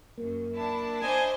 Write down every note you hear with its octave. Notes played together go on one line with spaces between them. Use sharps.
F#2 A#3
D4 E4 A5
C5 D#5 G#5